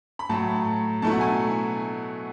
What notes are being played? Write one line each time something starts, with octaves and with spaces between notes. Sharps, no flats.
B5
A2 F#3 A3 A5
B2 F#3 A3 E4 A5
F#5
G#5